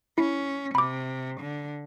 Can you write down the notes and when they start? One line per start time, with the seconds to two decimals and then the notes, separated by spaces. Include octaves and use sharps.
0.18 C#4 E4
0.75 C3 B5 D6
1.41 D3